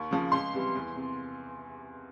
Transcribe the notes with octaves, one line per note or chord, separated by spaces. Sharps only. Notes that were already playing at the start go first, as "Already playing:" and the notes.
Already playing: D#2 C#6
C#3 F3
C#2 C6
C3 E3 G3
E2
C3